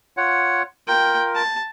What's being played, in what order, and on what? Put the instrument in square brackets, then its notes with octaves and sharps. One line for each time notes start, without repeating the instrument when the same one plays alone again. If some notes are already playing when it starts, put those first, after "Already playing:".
[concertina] F4 C#5 F#5
[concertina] F4 A#4 [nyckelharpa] G5
[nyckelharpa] A5